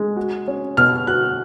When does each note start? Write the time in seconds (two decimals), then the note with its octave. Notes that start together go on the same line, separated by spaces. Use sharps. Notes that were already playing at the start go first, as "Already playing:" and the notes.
Already playing: G#3
0.16 F#4
0.48 C#4
0.77 B2 F6
1.07 F#4 F#6